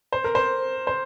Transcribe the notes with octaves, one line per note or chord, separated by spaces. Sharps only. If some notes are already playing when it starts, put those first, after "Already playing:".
C5
A#4
C5
C5